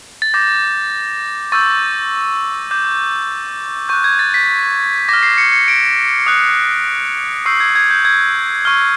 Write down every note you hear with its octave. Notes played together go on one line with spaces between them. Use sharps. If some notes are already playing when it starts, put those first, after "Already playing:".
A6
D6 G6 A#6
C#6 E6 G6 A6
D6 G6
C#6 F#6 G6
G#6
A6
B6
D6 F6 A#6
C7
C#7
C#7
D7
D#6 F#6
C#6 E6 G6 C7
G#6
G#6
G6
G#6
C#6 F6